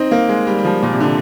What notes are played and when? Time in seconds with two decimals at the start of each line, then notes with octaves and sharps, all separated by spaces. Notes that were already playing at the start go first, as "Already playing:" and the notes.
Already playing: C4 D#4
0.11 A#3
0.29 G#3
0.47 G3
0.58 G3
0.64 F3
0.83 A#2
0.93 C3
1.00 D3